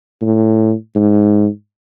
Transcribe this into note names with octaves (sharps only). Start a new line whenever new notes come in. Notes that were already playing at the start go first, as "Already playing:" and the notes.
A2
G#2